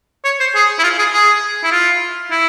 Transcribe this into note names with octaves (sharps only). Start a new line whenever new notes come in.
C#5
C5
G#4
E4
F4
G#4
G#4
E4
F4
E4